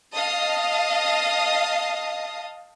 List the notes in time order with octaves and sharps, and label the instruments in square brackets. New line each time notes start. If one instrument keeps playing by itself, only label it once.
[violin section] D#5 F5 A5 D#6